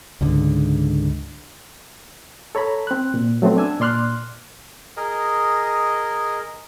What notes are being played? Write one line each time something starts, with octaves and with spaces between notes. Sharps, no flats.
C#2 G#2 D3
A4 C#5 A#5 B5
C4 F#6
A#2
F#3 A3 B3 C4
D4 G#5 E6
A#2 D5 C6 F6 F#6
G#4 A#4 D#5